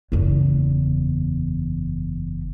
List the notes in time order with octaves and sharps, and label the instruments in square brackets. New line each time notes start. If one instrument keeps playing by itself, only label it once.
[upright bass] F#1 E2